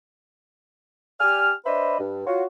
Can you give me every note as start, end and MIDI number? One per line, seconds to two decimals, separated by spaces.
1.20 1.52 67
1.20 1.52 74
1.20 1.52 80
1.20 1.52 89
1.65 1.97 62
1.65 1.97 71
1.65 1.97 72
1.65 1.97 75
1.65 1.97 76
1.65 1.97 83
1.99 2.26 43
2.27 2.44 65
2.27 2.44 66
2.27 2.44 73